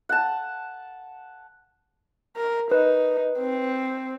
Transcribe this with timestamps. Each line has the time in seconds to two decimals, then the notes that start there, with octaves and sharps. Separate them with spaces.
0.09 F#5 A5
2.37 A#4
2.71 D#4 B4
3.38 C4